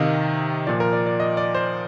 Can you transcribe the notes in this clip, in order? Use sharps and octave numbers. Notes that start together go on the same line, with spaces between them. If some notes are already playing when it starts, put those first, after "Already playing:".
Already playing: C3 D#3 D#5 F5
A#2 F3 D5
A#4
D5
D5
D#5
D5
C5